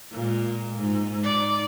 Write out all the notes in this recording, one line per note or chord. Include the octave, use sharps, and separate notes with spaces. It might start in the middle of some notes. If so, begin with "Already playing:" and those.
A#2 G#3
G#2
D#4 D5